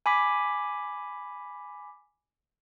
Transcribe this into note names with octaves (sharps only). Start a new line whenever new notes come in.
G#5 B5 D6 B6